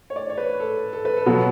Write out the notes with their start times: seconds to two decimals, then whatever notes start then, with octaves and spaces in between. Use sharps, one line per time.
0.10 C#5
0.16 D5
0.30 C#5
0.38 B4
0.60 A4
0.93 A4
1.05 B4
1.17 A4
1.26 B2 F#3 B3 F#4